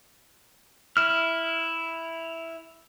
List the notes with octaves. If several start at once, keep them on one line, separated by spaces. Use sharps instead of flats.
E4 F6